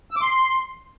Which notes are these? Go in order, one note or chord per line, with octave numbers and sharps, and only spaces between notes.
E6
D6
C6